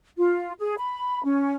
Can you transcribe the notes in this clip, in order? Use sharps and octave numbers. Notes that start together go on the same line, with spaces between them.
F4
G#4
B5
C#4